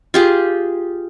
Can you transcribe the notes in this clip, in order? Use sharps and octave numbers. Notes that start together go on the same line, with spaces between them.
F4 G4 G#4